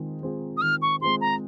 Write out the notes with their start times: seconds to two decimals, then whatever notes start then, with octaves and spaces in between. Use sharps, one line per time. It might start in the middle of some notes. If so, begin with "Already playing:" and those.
Already playing: D#3 G#3 C4 F4
0.22 G#3 C4 F4 G#4
0.57 D#6
0.62 D#3 F6
0.82 C#6
1.01 G#3 C4 F4 G#4 C6
1.21 A#5